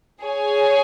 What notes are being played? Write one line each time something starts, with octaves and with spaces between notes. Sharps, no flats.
G#4 C#5 G#5